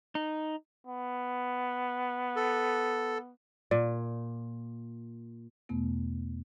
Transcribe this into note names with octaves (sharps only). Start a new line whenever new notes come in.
D#4
B3
A4
A#2 D5
E2 B2 A3 B3